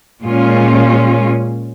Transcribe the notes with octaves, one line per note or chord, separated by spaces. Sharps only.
A#2 G#3 C#4 F4